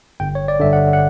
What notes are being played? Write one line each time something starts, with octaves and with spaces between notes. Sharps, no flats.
G1 G5
C#5
D5
G2 D3 E5
F#5
F#5